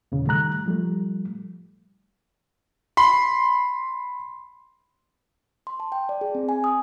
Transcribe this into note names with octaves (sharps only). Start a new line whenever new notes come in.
E2 A#2 C#3
D#3 G3 A3 A#5 F#6
F3 G3 A3
B5 C6
C6
A5
G5
D5
G#4
C4
G#5
D#6